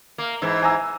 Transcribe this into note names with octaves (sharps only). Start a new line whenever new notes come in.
A#3
G#2 E3
G#5 A#5 E6